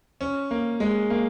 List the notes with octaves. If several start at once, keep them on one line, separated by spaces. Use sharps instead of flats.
C#4
A#3
G#3
A#3